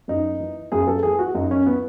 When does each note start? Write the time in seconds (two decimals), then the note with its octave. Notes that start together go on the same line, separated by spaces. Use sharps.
0.08 F#2 D#4
0.40 E3
0.72 F#2 G#4
0.88 A4
1.03 E3 G#4
1.19 F#4
1.35 F#2 D#4
1.51 C#4
1.66 E3 B3